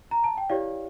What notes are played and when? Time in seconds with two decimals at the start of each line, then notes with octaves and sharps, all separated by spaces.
0.11 A#5
0.24 A5
0.38 G5
0.49 E4 G4 C#5 D5 F5